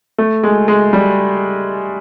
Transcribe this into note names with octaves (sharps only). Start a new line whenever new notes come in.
A3
G#3
G#3
G3